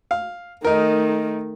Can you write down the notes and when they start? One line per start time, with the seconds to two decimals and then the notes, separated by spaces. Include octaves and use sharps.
0.11 F5
0.65 D#3 A3 D#4 A#4